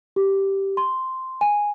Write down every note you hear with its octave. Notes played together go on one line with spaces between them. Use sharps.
G4
C6
G#5